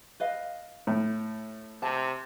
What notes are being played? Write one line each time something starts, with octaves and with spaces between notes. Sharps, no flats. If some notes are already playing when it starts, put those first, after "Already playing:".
B4 D#5 F5
A2
C3 A5